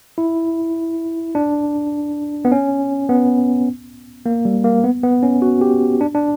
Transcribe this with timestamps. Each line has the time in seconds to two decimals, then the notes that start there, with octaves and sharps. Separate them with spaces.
0.18 E4
1.35 D4
2.45 B3
2.52 C#4
3.09 B3
4.26 A#3
4.45 G3
4.64 A#3
4.84 B3
5.03 B3
5.23 C#4
5.42 F#4
5.61 G4
6.01 D4
6.15 D4